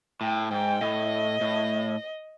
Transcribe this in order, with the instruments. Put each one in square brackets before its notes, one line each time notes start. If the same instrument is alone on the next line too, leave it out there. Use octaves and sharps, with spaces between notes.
[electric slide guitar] A2 [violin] G5
[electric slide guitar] G#2 [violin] G5
[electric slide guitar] A2 [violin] D#5
[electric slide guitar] A2